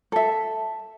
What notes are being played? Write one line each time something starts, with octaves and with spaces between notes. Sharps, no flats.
A4 E5